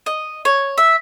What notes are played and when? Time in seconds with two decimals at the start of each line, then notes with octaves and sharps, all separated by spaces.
0.06 D#5
0.45 C#5
0.78 E5